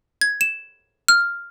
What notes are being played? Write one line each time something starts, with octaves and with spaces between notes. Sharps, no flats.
G#6
E7
F6